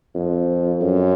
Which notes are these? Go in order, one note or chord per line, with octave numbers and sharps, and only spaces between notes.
F2
F#2